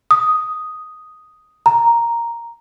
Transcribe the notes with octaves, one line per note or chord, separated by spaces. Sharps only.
D#6
A#5